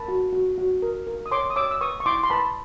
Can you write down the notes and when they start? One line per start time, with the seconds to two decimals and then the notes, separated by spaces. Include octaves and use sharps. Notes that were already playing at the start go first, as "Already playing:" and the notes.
Already playing: A#4 A5 B5
0.08 F#4
0.33 F#4
0.58 F#4
0.82 A#4
1.07 A#4
1.26 D#6
1.32 C#5 C6 D6
1.50 D#6
1.56 C#5 D6 E6
1.71 E6
1.81 B4 C#6 D#6
2.00 C#6
2.06 E4 C6 D6
2.23 C6
2.30 B4 A5 B5